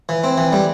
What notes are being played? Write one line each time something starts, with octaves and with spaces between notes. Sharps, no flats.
E3
C4
E3
G3